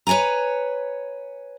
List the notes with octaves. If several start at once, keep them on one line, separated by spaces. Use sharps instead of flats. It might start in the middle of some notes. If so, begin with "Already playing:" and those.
B4 C#5 D5 G#5 A#5